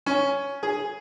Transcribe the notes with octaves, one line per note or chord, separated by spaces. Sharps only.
C#4
G#4